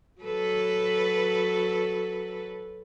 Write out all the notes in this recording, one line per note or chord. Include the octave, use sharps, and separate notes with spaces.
F#3 A4 B4